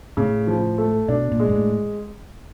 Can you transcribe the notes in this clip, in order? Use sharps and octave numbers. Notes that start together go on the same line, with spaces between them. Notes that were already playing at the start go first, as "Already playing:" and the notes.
A2 C#3
F3
A3
B2 D4
A#2
G#3
G#2
A2